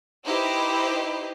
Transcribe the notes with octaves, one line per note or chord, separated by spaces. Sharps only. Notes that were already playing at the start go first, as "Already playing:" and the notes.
D#4 E4 G4 B4 C5 D#5